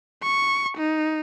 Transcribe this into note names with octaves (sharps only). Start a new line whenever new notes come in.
C#6
D#4